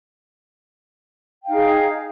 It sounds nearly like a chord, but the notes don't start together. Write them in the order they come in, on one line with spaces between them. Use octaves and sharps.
G5 F5 D#4 G#4